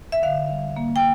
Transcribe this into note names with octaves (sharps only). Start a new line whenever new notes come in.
E5
D3 F5
G3
A#3
G5